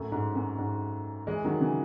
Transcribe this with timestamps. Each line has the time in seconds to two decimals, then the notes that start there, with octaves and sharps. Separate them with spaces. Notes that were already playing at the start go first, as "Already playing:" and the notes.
Already playing: F#2 A2
0.12 G#2
0.35 F#2
0.58 G#2
1.27 E3 G#3
1.45 D#3 F#3
1.61 C#3 E3